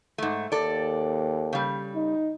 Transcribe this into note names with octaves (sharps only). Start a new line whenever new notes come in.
G#2 A3
D#2 A4 D5
C#3 G3
D#4